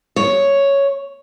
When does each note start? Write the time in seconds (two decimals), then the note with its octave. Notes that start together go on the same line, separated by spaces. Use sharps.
0.16 C#5